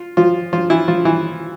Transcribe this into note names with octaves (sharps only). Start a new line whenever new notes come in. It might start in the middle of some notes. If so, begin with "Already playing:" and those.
Already playing: F4
F3 F4
F3 F4
E3 E4
F3 F4
E3 E4